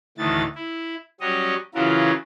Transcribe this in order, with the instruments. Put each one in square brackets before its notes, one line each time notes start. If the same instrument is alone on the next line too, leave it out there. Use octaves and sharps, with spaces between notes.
[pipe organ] D2 A2 D#3 E3 A6
E4
F#3 G3 C#4 C#5 D#5
C#3 E3 F#3 E4 F4 A#4